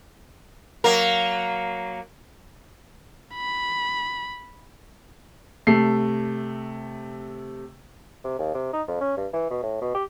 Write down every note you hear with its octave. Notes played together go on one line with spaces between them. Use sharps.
F#3 A#3 A#4
B5
C3 A3 C7
C3
D#2
C3
D#4
F2
C#4
G2
E3
B2
A2
B2
G4